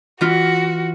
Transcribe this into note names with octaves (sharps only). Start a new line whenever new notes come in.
E3 F4 F#4